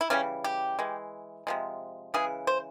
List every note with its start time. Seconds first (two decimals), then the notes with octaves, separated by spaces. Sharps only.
0.01 E4
0.10 C#3 E3 G3 C#4
0.44 G4
0.79 E3 G#3
1.47 C3 F3 G#3
2.14 C#3 E3 G#3 G#4
2.47 C5